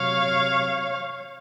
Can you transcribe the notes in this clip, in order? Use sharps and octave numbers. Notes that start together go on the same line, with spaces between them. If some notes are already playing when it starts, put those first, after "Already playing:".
Already playing: C3 F#3 C#5 F5